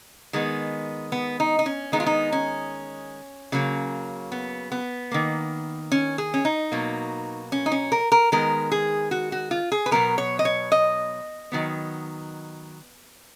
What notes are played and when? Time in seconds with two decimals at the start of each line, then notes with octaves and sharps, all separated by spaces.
0.33 D#3 G#3 B3
1.12 B3
1.40 D#4
1.59 D#4
1.66 C#4
1.92 D#3 G#3 B3 D#4
2.00 F4
2.06 D#4
2.32 C#4
3.52 C#3 F#3 A#3
4.32 B3
4.72 B3
5.11 D#3 A#3
5.92 C#4
6.18 G#4
6.34 C#4
6.45 D#4
6.72 B2 F#3 A#3
7.52 C#4
7.66 D#4
7.72 C#4
7.92 A#4
8.12 A#4
8.32 D#3 G#3 B3 A#4
8.72 G#4
9.11 F#4
9.32 F#4
9.51 F4
9.72 G#4
9.86 B4
9.91 B2 F#3 B3 A#4
10.18 C#5
10.39 D#5
10.45 C#5
10.72 D#5
11.52 D#3 F#3 B3